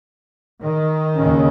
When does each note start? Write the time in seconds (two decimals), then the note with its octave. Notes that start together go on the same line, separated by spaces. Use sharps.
0.62 D#3
1.16 D#2 C#3